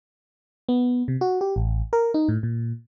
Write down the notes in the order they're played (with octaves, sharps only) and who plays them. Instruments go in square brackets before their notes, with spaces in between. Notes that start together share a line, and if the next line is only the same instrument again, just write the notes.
[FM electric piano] B3
C3
F#4
G4
A1
A#4
D#4
A2
A#2